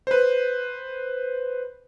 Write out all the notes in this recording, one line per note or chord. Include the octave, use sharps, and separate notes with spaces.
B4 C5